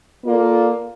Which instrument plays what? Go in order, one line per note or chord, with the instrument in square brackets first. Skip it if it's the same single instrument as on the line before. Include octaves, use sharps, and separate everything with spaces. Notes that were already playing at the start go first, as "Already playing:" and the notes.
[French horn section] A#3 F4 A4 D5